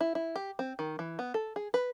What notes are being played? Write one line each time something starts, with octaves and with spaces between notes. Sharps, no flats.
E4
E4
G4
C4
D#3
E3
B3
A4
G#4
B4